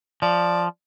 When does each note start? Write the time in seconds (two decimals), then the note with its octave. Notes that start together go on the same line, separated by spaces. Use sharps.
0.22 F3 D5